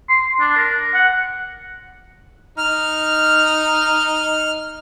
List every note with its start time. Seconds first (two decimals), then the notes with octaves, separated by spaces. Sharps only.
0.09 C6
0.40 D4
0.57 A#4
0.94 F#5
2.58 D#4 F6